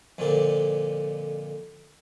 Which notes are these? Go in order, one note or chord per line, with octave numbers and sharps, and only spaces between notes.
F2 A#2 D3